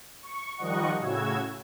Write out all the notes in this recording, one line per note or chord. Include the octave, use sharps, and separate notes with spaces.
C#6
D#3 F3 G3 D#5 F#5 C#6
A2 C#3 F#4 E6 G#6